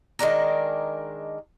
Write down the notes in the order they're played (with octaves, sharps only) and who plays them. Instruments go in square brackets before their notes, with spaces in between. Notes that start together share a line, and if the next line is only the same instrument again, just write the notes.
[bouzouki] D#3 G#3 D4 A#4